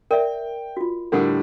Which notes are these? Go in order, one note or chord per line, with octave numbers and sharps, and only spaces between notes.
A#4 D5 E5 G5
F4 F#4
A2 D3 G3 A4 A#4 F#5